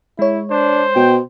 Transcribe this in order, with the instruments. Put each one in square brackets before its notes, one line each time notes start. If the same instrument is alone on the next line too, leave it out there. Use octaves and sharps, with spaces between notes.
[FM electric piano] G#3 C#5 [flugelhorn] E4
[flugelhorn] D4 [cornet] C5
[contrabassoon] B2 [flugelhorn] G5